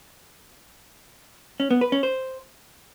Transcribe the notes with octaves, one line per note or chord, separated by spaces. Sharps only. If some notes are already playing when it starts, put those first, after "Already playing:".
C#4
B3
B4
C#4
C5